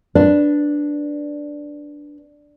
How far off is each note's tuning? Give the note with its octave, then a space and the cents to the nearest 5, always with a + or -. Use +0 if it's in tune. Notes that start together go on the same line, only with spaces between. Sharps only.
D4 +0 B4 +0